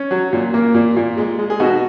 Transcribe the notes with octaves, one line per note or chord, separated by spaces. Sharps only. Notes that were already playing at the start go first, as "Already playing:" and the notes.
Already playing: C#4
F#3
A#2
A#3
A#2
A#2
G#3
G#3
G#4
B2 D#4 F#4